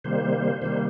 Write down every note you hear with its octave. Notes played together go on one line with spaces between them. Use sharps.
C3 D#3 G3 A#3 C5
C3 D#3 G3 A#3 C5